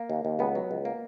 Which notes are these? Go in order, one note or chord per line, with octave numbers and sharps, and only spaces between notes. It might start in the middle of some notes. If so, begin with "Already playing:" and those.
Already playing: A#3
D#2
D#2
C#2 B3
F#3
C#2
A#3